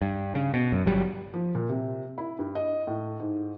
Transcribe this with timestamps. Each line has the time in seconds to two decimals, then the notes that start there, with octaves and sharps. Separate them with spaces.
0.02 G2
0.35 C#3
0.54 B2
0.72 F#2
0.86 G1 F#3 G3
1.34 F3
1.55 A#2
1.69 C3
2.18 E4
2.39 G2
2.55 D#5
2.87 A2
3.20 G#2